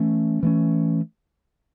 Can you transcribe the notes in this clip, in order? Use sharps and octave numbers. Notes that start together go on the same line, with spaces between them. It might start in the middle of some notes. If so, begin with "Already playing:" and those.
Already playing: E3 A3 C#4
E3 A3 C#4